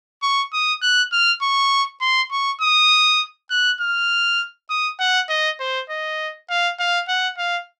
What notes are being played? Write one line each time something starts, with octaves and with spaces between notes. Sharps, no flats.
C#6
D#6
F#6
F6
C#6
C6
C#6
D#6
F#6
F6
D#6
F#5
D#5
C5
D#5
F5
F5
F#5
F5